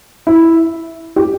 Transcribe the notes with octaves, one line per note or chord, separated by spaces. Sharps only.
E4
G4